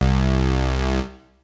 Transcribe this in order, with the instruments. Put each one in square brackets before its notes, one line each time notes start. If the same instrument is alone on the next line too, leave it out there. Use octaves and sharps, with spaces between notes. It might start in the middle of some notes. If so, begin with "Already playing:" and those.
[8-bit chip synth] C2